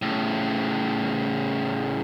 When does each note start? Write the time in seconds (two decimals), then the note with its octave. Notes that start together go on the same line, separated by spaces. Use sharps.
0.02 A2 C#3